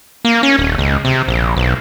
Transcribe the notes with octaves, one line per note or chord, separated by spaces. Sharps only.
A#3
C#4
D#1
C#2
C3
A#1
B1